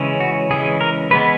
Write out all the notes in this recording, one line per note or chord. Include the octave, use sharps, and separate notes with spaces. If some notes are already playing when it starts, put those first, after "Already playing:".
Already playing: C#3 E3 G#3 C#4
F#4
C#3 E3 G#3 C#4 G#4
A#4
E3 G#3 B3 B4